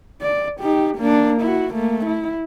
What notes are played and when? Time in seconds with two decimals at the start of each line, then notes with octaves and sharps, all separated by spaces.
0.22 D5
0.61 D#4 G4
0.97 A#3 D4
1.42 E4 F#4
1.74 A3 A#3
2.06 E4